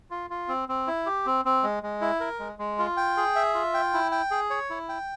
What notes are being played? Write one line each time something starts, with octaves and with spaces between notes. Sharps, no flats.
F4
F4
C4
C4
E4
G4
C4
C4
G#3
G#3
E4
A#4
G#3
G#3
F4
G5
G#4
E5
F4
G5
E4
G5
G#4
C#5
E4
G5